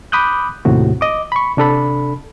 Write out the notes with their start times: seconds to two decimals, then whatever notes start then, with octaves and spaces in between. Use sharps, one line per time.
0.12 B5 D6 D#6 F#6 G6
0.65 D#2 A2 C3 F#4
1.01 D#5 D6
1.32 B5 C#6
1.57 C3 D4 A4 B5